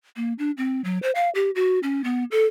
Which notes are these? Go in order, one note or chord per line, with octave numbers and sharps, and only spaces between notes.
A#3
D4
C4
F#3
C5
F5
G4
F#4
C#4
B3
A4